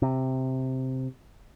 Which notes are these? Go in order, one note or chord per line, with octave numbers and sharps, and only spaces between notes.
C3